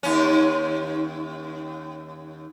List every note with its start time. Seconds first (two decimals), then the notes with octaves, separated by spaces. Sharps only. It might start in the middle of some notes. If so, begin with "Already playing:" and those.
0.03 D#2 C#4